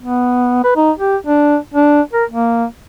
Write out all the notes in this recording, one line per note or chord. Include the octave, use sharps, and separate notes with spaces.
B3
B4
D#4
G4
D4
D4
A#4
A#3